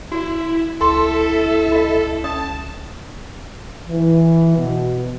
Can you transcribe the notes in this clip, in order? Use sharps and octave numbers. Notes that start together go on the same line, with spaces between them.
E4 F#4 D5
C#2 E4 A4 E5 G5 C6
F4 D#5
C#4 D5 A5 D#6
E3
B2